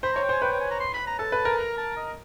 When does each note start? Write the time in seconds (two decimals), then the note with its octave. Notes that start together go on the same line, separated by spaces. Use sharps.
0.03 C5 B5
0.13 C#5 A#5
0.23 G5
0.29 C5 G#5
0.42 B4 G5
0.52 G5
0.61 G#5
0.71 A#5
0.80 C6
0.94 B5
1.07 A#5
1.19 A4 A5
1.32 B4
1.45 A#4
1.58 A#5
1.77 A5
1.97 D#5